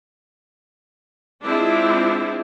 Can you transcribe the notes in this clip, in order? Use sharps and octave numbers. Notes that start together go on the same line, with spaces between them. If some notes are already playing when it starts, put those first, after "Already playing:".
G#3 C4 D4 E4 F4